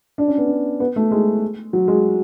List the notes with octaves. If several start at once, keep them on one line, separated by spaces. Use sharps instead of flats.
D4
C#4
B3
C#4
B3
A3
G#3
F#3
G#3